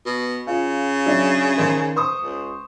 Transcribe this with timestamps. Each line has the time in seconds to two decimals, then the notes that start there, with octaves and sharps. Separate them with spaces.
0.06 B2
0.47 C#3 F4
1.06 F#3 D4 E5
1.57 D#3 G#4 C5
1.96 C5 C#6 D#6
2.22 C#2